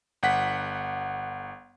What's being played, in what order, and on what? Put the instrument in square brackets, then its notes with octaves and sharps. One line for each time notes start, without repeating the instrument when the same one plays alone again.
[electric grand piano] G1 F#5 B6